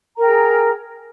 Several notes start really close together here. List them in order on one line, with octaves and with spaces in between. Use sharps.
A#5 A#4 G5 G#4